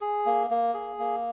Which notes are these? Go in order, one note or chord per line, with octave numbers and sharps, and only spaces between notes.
G#4
A#3
A#3
G#4
A#3